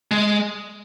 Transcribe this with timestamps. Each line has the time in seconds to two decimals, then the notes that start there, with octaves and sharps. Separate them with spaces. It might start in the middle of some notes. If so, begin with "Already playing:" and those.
0.11 G#3